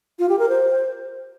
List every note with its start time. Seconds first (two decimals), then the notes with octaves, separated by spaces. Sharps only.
0.19 F4
0.29 G4
0.39 A#4
0.49 C5